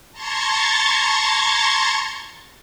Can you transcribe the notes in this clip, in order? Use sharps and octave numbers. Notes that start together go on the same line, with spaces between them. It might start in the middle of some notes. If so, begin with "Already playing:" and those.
A5 A#5 C6 C#6 G#6 A6